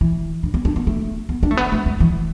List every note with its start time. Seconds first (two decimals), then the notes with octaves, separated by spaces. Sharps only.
0.01 E3
0.43 D3
0.54 B3
0.65 D4
0.76 B3
0.87 A3
1.29 B3
1.43 D4
1.51 A3
1.57 B3
1.72 A3
1.86 G3
2.00 E3